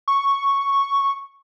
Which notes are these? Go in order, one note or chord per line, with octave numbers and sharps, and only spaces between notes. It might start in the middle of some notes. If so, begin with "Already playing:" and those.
C#6